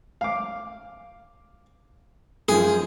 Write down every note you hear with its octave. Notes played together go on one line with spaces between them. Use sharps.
F5 D6
F#2 F3 G#4